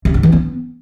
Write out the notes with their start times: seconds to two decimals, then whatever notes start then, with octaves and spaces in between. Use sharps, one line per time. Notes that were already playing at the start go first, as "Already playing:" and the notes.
0.05 C3
0.14 G2
0.23 E3
0.32 B3